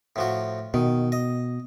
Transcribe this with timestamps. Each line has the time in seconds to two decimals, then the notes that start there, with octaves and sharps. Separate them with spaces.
0.16 A2 F3 F#4
0.74 B2 D#3
1.12 D#5